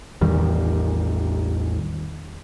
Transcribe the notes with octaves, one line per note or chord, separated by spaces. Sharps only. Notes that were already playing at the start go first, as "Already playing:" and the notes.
A1 E2 D#3 G3